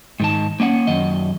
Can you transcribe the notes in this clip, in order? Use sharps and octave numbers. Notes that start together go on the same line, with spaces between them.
G#2 D#3 A5
A#3 C#4 D#5 F#5
F#2 D#3 D#5